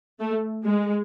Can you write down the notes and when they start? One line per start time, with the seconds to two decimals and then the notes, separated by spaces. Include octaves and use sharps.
0.19 A3
0.64 G#3